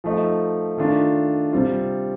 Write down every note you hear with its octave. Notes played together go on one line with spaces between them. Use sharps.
F3 A3 D#4
D#3 A3 D4 F4
C3 G3 C4 F4